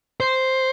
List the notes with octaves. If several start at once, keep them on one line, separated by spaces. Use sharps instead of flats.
C5